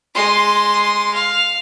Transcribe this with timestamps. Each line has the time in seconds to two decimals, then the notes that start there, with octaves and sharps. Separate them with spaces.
0.15 G#3 C6
1.14 F5